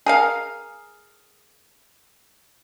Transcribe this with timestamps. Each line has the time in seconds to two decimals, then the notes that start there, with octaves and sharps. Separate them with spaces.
0.06 G#4 A#4 F5